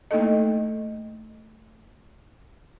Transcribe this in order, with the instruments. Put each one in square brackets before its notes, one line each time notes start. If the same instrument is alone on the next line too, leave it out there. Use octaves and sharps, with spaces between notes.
[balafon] A3 A#3 D#4 E4 A4 D#5